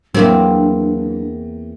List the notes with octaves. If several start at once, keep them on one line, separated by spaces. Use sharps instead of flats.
E2 F#3 A#3 C4 D4